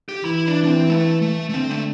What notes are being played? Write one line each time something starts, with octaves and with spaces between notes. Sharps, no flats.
G4
E3 E4
D4
D4
C4
A3
A3
A3
D3 C4
A3